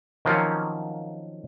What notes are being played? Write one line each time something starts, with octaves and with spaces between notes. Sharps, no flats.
D#3 F3 F#3 A#3 C4 C#4